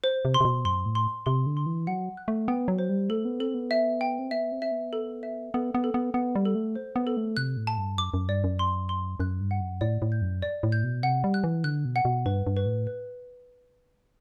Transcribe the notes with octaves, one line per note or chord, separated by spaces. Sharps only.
C5
C3
C6
C3
B2
F#2 C6
A2
C6
C3 C6
D3
C6
E3
F#3 F#5
F#6
A3
B3 G5
F#3
C5
G3
A3 A4
B3
C4 A4
B3
E5
G5
C4
B3 E5
C4
E5
B3
A4
E5
B3 A4
B3
A4
B3
B3 F#5
G3
A4
A3
C5
B3
A4
A3
C3 F#6
A2
A5
G2
F#2 D6
F#2
G2 D5
F#2
C6
C6
F#2 F#6
G2
F#5
F#2
A2 D5
A2
G6
F#2
D5
A2
G6
B2
C3 F#5
G3
F#6
E3
D3 F#6
B2
F#5
B2
G2 B4
G2
B4
A2
B4